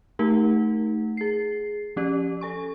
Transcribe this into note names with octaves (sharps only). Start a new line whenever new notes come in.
A3 D#4 G4 A#4 F#5
G#4 C7
F3 C#4 G4 D5
A4 G#5 C#6